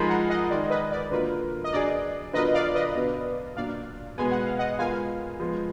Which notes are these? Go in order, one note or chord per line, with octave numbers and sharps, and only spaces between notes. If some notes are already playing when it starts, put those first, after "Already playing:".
Already playing: F3 G#3 D#4 A#4 G#5 B5
F#5 A#5
D#5 F#5
D#3 G#3 D#4 A#4 D5
B4 D#5
D5
D3 F#3 A#3 F4 A#4 B4
D#5
F#3 D4 G#4 D5
D3 F#3 B3 F4 A#4 B4 D#5
D5 F5
B4 D#5
B2 F#3 B3 D4
A#2 F#3 D4 D5 F5
B2 G#3 B3 G#5
F#5
F5
D#5 F#5
G#3 B3 F4 A#4 F5 G#5
F3 G#3 B3